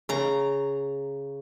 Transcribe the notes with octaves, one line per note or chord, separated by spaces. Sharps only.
C#3 A#5